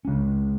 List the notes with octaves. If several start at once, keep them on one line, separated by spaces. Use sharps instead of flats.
C#3 G#3 C#4